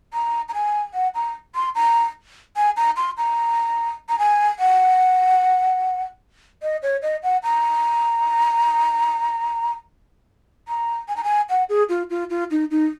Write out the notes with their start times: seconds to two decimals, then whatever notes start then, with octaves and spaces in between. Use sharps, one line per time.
0.13 A#5
0.49 A#5
0.54 G#5
0.94 F#5
1.15 A#5
1.55 C6
1.75 A#5
2.56 G#5
2.77 A#5
2.97 C6
3.18 A#5
4.09 A#5
4.19 G#5
4.59 F#5
6.62 D#5
6.83 C#5
7.02 D#5
7.23 F#5
7.43 A#5
10.68 A#5
11.08 G#5
11.16 A#5
11.24 G#5
11.49 F#5
11.69 G#4
11.89 F4
12.10 F4
12.30 F4
12.51 D#4
12.71 D#4